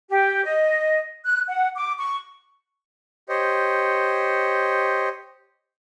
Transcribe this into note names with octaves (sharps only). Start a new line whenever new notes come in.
G4
D#5
F#6
F#5
D6
C#6
G4 C5 C#5 D#5